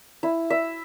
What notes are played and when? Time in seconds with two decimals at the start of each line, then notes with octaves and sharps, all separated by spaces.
0.23 E4
0.50 E5